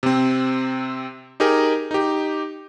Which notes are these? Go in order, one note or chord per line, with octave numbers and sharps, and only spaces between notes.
C3 C4
D#4 G4 G#4 A#4
D#4 G4